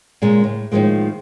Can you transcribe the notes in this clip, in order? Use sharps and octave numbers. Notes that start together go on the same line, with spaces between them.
A#2 C#3 G#3
A2
A2 D#3 F3 G#3 A#3